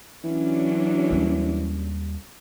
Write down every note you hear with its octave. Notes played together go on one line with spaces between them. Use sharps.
E3 F#3 C#4 D4
D#2 G3